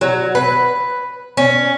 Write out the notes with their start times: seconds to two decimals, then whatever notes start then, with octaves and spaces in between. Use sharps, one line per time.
0.01 F#3
0.35 B4
1.37 C#4